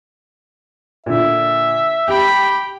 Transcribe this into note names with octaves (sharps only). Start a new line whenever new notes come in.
A#2 D3 E5
G4 G5 B5